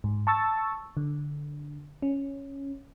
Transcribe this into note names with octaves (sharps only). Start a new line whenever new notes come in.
G#2
A5 C#6 E6 A6
D3
C#4